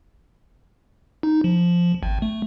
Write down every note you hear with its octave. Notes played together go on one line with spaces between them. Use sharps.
D#4
F3
G#1
A3